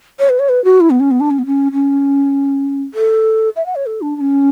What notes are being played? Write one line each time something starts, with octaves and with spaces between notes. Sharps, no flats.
C#5
B4
C#5
B4
F#4
E4
B3
C#4
B3
D4
C#4
B3
C#4
C#4
A4
E5
F#5
C#5
A4
D4
D4
C#4